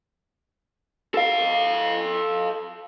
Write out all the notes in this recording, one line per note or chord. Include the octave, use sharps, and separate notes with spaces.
A4 F5